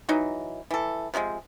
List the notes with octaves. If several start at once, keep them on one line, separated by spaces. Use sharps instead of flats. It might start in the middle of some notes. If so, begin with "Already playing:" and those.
E3 F#3 D#4
E3 A4
C3 F3 F#3 G#3